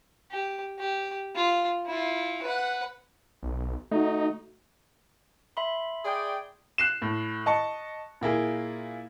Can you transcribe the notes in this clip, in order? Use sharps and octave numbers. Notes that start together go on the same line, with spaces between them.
G4
G4
F4
E4 F4
B4 F#5
B1
A3 D#4 F#4
E5 B5 C6
G#4 D5 G5
F#6 C7 E7
A2
D#5 A5 C#6 C#7
A#2 A#3 E4 G#4